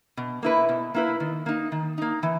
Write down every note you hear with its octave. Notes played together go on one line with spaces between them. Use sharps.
B2
A#3 E4 B4
B2
A#3 E4 B4
D#3
A#3 D#4
D#3
A#3 D#4
E3